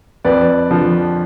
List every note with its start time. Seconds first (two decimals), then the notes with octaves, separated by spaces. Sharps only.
0.25 F2 B4 D5
0.70 D3 F3